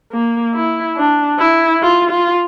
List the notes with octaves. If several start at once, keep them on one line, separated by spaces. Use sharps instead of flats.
A#3
E4
D4
E4
F4
F4